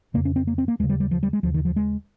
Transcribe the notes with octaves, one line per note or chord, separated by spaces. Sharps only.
F2 C#3 A#3
C#4
C4
A#3
C4
A#3
D#2 C#3 G#3
G3
G3
F3
G3
G#3
D#2 C#3 F3
D#3
F3
G#3